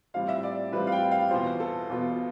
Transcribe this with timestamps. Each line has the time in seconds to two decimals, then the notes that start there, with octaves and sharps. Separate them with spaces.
0.14 A2 G3 C4 F4 F5
0.29 E5
0.43 D5
0.72 A2 G3 C4 F4 B4
0.87 F5
0.92 G5
1.11 F5
1.31 E2 B2 B3 F4 C5
1.60 A4
1.89 E2 B2 B3 F4